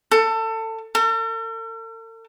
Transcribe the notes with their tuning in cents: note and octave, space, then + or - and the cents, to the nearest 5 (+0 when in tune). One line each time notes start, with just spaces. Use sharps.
A4 +25
A4 +45